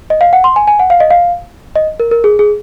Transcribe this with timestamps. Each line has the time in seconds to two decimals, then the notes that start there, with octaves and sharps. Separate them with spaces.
0.10 D#5
0.21 F5
0.33 F#5
0.44 C6
0.56 G#5
0.67 G#5
0.79 F#5
0.90 F5
1.00 D#5
1.11 F5
1.76 D#5
2.00 A#4
2.11 A#4
2.24 G#4
2.39 G#4